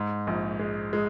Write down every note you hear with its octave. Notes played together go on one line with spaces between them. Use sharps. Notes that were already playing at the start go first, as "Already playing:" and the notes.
Already playing: G#2
A#1
G#3
G#3